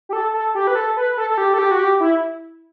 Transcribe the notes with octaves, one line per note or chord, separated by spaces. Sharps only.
G4
A4
A4
G4
B4
A4
B4
A4
A4
G4
A4
G4
F#4
G4
E4